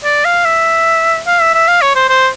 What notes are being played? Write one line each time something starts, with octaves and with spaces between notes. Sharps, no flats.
D5
F5
E5
F5
E5
E5
F5
C#5
C5
C5